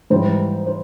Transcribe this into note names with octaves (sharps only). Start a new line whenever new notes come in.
G#2 E3 G3 C5
C5